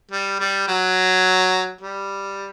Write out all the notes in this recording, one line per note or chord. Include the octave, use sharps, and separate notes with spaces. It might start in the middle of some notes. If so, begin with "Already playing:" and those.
G3
G3
F#3
G3